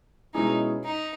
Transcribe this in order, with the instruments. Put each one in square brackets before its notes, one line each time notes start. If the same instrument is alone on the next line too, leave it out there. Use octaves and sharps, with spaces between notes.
[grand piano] B2 G#3 C#4 E4 G#4 [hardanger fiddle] D#4
[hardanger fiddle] D#4